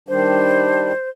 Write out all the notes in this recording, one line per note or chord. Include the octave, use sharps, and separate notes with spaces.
D#3 G3 D4 C5